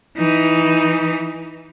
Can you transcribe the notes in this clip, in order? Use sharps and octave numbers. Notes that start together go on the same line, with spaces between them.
E3 D#4